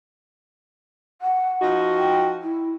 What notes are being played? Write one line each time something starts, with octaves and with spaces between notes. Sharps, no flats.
F#5
F3 D#4 F#4
G5
E4